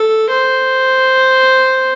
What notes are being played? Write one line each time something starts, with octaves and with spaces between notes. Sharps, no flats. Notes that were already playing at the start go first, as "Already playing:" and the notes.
Already playing: A4
C5